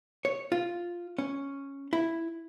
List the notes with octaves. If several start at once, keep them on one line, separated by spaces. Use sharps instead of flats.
C#5
F4
C#4
E4